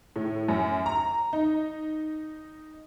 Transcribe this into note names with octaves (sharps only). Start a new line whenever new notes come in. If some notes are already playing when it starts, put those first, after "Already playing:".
A2
F#2
A#5
D#4